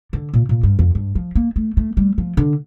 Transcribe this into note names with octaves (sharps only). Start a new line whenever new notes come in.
D3
A#2
A#2
G2
F2
G2
F3
A#3
A3
A3
G3
F3
D3